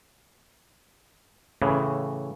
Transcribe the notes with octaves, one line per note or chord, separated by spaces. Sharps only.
A2 C#3 E3